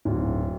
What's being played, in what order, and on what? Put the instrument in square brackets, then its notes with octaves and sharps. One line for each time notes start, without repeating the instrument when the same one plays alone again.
[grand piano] D1